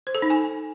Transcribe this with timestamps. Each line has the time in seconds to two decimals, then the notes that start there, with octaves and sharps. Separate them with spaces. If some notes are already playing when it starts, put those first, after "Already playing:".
0.07 C5
0.15 A4
0.22 D#4
0.30 G#5